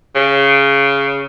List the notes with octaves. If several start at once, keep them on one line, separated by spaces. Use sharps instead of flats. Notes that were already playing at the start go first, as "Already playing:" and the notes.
C#3